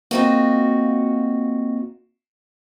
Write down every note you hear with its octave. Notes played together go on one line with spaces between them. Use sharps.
A#3 C4 D#4 F4 F#4